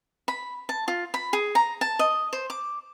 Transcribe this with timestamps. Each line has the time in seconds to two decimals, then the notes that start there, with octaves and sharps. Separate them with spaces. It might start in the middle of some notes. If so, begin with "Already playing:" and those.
0.28 B5
0.69 A5
0.88 F4
1.14 B5
1.33 G#4
1.55 A#5
1.81 A5
1.99 D#5
2.33 C5
2.50 D6